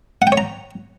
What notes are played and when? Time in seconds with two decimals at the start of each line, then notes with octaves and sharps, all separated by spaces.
0.22 F#5
0.27 G5
0.32 C#5
0.37 A#5